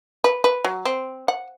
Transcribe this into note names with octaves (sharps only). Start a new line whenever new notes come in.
B4
B4
F#3
C4
F#5